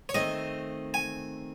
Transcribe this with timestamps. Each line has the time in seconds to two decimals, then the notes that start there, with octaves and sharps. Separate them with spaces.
0.09 C#5
0.14 D#3 A3 C4 D#5
0.94 G#5